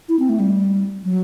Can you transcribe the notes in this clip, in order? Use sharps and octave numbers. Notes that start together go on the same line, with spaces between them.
E4
C4
A3
G3
F#3